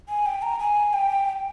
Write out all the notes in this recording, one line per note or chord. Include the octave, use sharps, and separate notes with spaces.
G#5
G5
A#5
G#5
G5